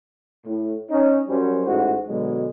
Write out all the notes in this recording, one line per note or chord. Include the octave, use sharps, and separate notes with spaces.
A2
C#4 D#4
F#2 F#3 G3 C#4 C5
A1 G#2 F#4
B2 D3 F#3 G#3